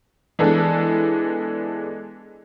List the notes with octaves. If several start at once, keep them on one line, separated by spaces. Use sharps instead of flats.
E3 G#3 B3 D4 A4